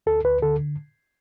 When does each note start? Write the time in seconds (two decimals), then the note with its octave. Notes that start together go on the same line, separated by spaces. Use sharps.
0.06 D2 A4
0.24 D2 B4
0.42 D3 A4